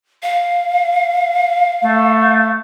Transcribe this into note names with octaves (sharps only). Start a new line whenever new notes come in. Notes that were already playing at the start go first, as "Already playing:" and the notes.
F5
A3